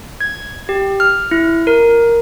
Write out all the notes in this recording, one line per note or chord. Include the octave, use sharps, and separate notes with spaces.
G#6
G4
F6
E4
A#4